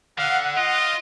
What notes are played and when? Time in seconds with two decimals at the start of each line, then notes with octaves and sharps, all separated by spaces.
0.18 D3 F5 F#5
0.57 F4 D#5